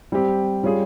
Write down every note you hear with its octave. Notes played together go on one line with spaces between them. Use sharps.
G3 C4 G4
G3 C#4 F4 G#4